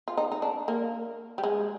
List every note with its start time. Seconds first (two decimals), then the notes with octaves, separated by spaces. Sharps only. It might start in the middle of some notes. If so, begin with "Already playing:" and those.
0.08 F4
0.17 D#4
0.32 D#4
0.42 D4
0.68 A#3
1.38 G3
1.44 G#3